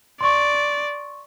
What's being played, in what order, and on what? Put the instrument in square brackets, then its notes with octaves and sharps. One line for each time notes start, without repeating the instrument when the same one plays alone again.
[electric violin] D5 [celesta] C6 C#6